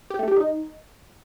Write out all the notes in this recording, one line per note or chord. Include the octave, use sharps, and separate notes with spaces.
G4
A3
G3
D#4